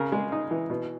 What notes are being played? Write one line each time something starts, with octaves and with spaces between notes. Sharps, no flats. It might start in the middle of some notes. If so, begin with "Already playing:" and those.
Already playing: C#3 A#4
G#3
D#4
E3
B2